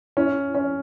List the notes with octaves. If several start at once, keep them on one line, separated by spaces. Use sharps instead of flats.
C#4 E4
C#4